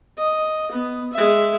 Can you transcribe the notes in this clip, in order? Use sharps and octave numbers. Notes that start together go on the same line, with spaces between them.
D#5
B3
G#3 E5